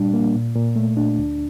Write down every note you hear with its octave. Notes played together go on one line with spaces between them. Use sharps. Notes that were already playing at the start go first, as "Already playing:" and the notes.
Already playing: A#2 G3 D4
A#3
A#2
A#2
A3
D4
D2